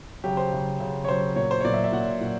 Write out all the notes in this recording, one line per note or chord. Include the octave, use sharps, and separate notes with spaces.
C#3 F#3 G4
C5
C#3 F#3
C#3 F#3
C#5
C#3 F#3 C5
A#2 F#3 C#5
C5
C#5
A#2 F#3 D5
E5
E5
A#2 F#3 F#5
A#2 F#3